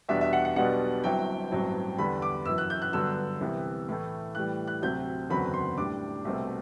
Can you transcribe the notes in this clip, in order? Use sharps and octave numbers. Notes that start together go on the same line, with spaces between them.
E2 B2 G3 B3 D4 E5
E5
F#5
F#5
B1 B2 G3 B3 D4 F#5
G1 G2 F#3 C4 E4 G5
A1 G2 F#3 C4 E4
E2 D3 G3 B5
D6
G1 F#2 E3 E6
F#6
G6
F#6
G2 D3 F#3 B3 E6
C2 C3 E3 B3
A2 E3 A3
A2 E3 G3 F#6
F#6
D2 C3 F#3 C4 G6
F#1 E2 D3 F#3 C4 B5
C6
A2 G3 D4 D6
C2 B2 A3 C4